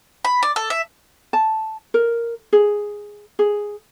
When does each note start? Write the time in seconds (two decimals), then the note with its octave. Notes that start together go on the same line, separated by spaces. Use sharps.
0.25 B5
0.43 D5
0.56 A4
0.70 E5
1.33 A5
1.94 A#4
2.53 G#4
3.39 G#4